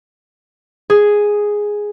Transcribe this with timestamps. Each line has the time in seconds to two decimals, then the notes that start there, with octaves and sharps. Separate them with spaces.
0.90 G#4